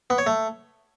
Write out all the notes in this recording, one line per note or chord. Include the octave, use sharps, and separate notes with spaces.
B3
C#5
A3